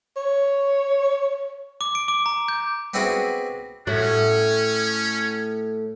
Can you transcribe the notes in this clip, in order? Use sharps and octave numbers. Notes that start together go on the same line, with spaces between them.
C#5
D6
D7
D6
A#5
G6
B3 C4 D4 E4 F#4 G#4
A2 C#4 F#4